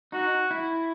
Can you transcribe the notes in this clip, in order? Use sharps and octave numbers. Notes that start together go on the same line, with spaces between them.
D#4 F#4
E4